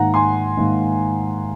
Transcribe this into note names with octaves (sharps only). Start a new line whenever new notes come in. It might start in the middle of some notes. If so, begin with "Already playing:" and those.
Already playing: G#2 D#3 A#3 F#5 A#5
G#5 C6
G#2 D#3 A#3